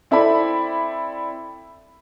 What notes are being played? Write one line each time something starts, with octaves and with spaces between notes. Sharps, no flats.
C4 E4 A4 D5 B5